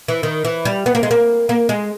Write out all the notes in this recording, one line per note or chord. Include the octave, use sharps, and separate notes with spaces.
E3
D#3
E3
G3
B3
A#3
G#3
A#3
A#3
G#3